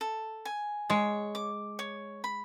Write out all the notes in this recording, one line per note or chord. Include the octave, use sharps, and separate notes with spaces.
A4
G#5
G#3 C#5
D6
C#5
B5